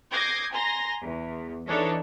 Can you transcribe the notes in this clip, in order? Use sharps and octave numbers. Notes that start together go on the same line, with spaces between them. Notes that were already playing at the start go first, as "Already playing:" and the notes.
D6 D#6 G6 G#6 A#6 C7
G#5 A#5 C6 A#6
E2
E3 D4 D#4 A4 C#5